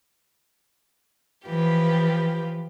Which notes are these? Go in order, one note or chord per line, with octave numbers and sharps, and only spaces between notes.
E3 F3 F4 G4 B4